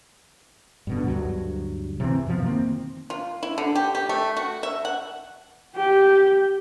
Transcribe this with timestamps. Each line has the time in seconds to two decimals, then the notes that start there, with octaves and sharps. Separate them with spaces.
0.87 G2 B2 D3
1.07 D2 G2 F#3
2.00 C3 E3 C4
2.26 F#2 B2 E3 F3
2.42 D#3 A#3 C4
3.10 F4
3.43 E4
3.58 D3
3.75 G4
3.95 G4
4.09 A3
4.36 F#4
4.63 E5
4.85 F#5
5.76 G4